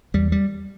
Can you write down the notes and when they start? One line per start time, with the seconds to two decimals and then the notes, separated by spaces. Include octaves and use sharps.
0.14 E2 G3
0.32 G3